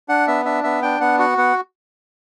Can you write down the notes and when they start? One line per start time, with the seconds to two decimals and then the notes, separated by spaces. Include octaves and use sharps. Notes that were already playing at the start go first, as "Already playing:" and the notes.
0.09 D4 F#5
0.27 B3 E5
0.45 D4 E5
0.64 B3 E5
0.82 D4 G5
1.01 B3 F#5
1.19 F#4 F#5
1.38 B3 F#5